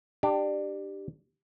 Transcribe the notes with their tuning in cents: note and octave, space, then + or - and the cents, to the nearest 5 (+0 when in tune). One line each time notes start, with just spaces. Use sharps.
D4 +25 G4 +0